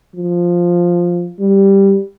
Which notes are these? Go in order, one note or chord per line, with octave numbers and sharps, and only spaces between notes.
F3
G3